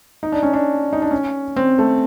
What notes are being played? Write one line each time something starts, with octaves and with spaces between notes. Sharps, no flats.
D#4
D4
C#4
D4
D#4
D4
C#4
C4
A3